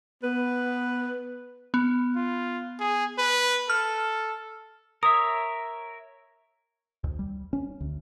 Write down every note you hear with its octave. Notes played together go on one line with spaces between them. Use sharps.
B3 B4
B3
F4
G#4
B4
A4 F6
A#4 C#5 E5 D#6
D2
G3
C#4
D2